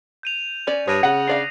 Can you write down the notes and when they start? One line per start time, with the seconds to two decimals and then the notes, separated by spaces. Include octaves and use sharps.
0.23 G6 D#7 F7
0.67 C#4 D5
0.88 G2 C#5 D#6 A#6 D#7
1.03 C#3 F#5
1.28 D4 D5 F5 C7